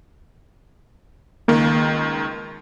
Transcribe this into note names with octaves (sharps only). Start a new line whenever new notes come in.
C#2 D#3 A#3